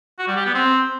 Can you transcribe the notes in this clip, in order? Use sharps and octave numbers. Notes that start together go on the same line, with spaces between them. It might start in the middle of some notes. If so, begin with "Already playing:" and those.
F#4
G3
G4
B3
C4